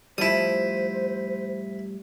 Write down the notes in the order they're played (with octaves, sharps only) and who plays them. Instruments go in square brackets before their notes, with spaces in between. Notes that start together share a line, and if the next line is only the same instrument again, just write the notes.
[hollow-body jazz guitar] A2 F3 G3 [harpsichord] E4 D#6 [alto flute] C5